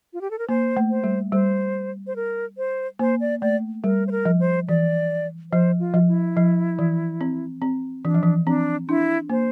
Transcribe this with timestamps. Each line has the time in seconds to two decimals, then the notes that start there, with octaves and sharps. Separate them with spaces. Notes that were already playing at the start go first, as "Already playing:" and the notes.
0.13 F4
0.21 G4
0.31 A4
0.39 A#4
0.48 A#3 C5
0.77 A3
0.90 C5
1.04 G3
1.32 G3 C5
2.07 C5
2.16 A#4
2.58 C5
2.99 A#3 C5
3.20 D5
3.41 A3 D5
3.84 G3 A#4
4.07 C5
4.11 A#4
4.25 F3
4.40 C5
4.68 E3 D5
5.52 F3 C5
5.80 F4
5.94 F3
6.08 E4
6.37 F3
6.79 E3
7.21 C4
7.62 C4
8.05 E3 D4
8.14 F3
8.23 E3
8.47 C4 D4
8.89 D4 E4
9.30 A#3 C5